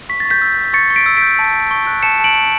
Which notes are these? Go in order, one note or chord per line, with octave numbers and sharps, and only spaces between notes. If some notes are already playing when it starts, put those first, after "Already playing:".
C#6 B6
A6
C#6
G6 B6
E6
G6
C#6 A6 C#7
C#6
B6 D7
E6
B6 D7
G6
A5
A5
C#6
F#6
A5 C#7 E7
A5 D7 F#7
C#6